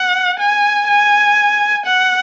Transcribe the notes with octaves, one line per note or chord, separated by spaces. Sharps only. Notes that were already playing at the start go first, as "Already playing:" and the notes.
Already playing: F#5
G#5
G#5
F#5